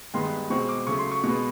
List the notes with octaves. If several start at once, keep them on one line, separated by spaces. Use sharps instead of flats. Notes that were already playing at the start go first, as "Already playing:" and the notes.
G2 D#3 G#3 B3 C6
B2 G#3 C4 C#6
D6
C#3 F#3 A3 C#6
C6
C#6
B2 G#3 B3 C#6